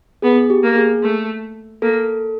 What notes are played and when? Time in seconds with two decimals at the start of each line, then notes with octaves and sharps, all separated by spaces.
0.22 B3 G#4
0.50 G4
0.63 A#3
0.76 G#4
1.03 A3
1.82 A#3 A4